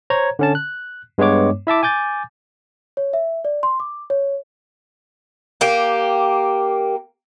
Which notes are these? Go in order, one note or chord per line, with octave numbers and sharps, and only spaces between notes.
C5 C#5 A#5 G#6
D3 C#4 A5
F#6
G2 G#3 B3 C#5 D6
E4 E5 A5 D6
G#5 D6 G6 A6
C#5
E5
D5
C6
D6
C#5
A#3 G4